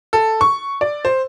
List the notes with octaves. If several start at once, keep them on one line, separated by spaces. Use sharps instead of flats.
A4
C#6
D5
C5